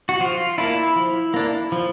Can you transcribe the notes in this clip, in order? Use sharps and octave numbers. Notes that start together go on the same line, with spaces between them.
F#4
F3 F4
A#3 D4 E4
F3
A#3 D4
F3